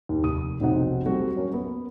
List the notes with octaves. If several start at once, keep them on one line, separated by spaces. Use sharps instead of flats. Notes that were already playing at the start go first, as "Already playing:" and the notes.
D#2
F1 D#6 D#7
F1 B1 F#3 C4 D#4 F#5
G3 C4 F#4 A4
F#3 A#3 C#4 A#4
B3